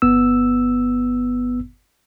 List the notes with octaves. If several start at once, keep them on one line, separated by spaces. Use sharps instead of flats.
G1 B3 E6